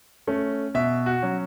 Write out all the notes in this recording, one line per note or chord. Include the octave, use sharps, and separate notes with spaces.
A3 C#4
B2 E5
F#4
F#3 C#4